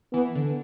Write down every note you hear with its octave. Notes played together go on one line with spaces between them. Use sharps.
E3 B3
D3